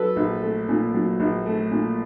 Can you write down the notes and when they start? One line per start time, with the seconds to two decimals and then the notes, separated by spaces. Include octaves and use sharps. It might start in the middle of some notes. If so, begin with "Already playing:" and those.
Already playing: F#3 A4 B4
0.16 A#1
0.42 A3
0.69 A#2
0.94 F#3
1.20 A#1
1.46 A3
1.71 A#2